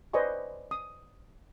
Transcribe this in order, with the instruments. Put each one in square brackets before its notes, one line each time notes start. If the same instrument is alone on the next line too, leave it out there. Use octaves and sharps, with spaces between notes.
[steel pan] B4 C5 D5 D#5 G#5 C#6
D#6